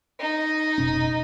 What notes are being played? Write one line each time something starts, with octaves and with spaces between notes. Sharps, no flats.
D#4
F1 B2 C#4